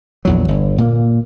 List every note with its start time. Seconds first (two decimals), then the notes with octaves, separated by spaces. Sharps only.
0.25 A#1 E2 F#3
0.48 G1
0.78 A#2 A#3